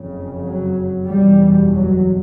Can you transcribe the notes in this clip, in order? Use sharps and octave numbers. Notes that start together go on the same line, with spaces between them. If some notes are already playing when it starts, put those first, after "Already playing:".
Already playing: F#1 F2 C#3
F#3
F#1 E2 B2 G3
F#3